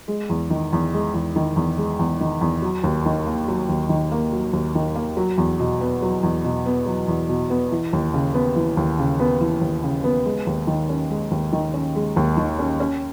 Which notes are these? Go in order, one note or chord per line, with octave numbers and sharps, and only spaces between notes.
G#3
E2
D#3
E2
G#3
E2
D#3
E2
G#3
E2
D#3
E2
F#3
D#2
D#3
A#3
F#3
D#2
D#3
A#3
F#3
D#2
D#3
A#3
F#3
E2
B2
B3
F#3
E2
B2
B3
F#3
E2
B2
B3
E3
D#2
C#3
B3
E3
D#2
C#3
B3
E3
D#2
C#3
B3
G#3
D#2
D#3
C#4
G#3
D#2
D#3
C#4
G#3
D#2
D#3
C#4
C#4